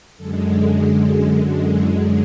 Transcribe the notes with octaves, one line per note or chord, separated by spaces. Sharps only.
F#2 D3 G#3 A4
A4
G#4
G#4
F#2 D3 G#3 F#4
E4